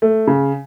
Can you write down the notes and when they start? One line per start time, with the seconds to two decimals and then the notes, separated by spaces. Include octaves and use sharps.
0.02 A3
0.27 C#3